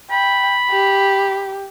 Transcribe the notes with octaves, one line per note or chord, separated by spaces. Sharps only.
G5 B5
G4